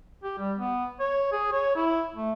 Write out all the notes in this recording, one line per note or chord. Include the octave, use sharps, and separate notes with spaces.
G4
G3
B3
C#5
G#4
C#5
E4
A3